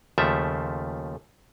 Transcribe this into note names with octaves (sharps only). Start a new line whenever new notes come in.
D#2 C#3 F3 A3 E5